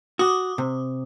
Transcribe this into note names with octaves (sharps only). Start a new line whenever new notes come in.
F#4 D6 D#6
C3